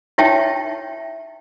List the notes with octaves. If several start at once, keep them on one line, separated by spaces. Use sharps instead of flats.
D#4 E4 C#5 E5 G5 A5